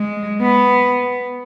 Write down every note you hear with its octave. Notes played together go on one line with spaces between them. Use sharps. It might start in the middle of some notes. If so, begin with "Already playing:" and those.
Already playing: G#3
B3